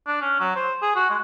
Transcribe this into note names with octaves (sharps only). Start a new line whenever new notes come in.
D4
C#4
F#3
C5
G#4
F#4
G#3